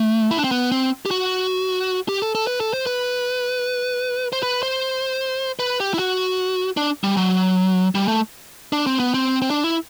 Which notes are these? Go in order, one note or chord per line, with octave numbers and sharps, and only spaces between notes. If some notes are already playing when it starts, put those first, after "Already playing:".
Already playing: A3
E4
D4
C4
B3
C4
G4
F#4
G4
A4
A4
B4
A4
C5
B4
C5
B4
C5
B4
G4
E4
F#4
D4
G3
F#3
G3
A3
D4
C4
B3
C4
C4
D4
E4